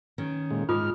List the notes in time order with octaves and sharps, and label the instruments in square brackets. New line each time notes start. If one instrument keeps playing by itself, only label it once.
[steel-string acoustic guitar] D#3 C#4
[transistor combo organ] A#2 G#3
[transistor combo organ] G#2 D#4 F6 [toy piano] F4 G#4 D#6